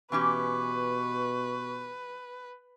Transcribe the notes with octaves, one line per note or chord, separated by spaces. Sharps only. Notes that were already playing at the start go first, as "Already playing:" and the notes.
B2 E3 C#4 G4 B4 C#6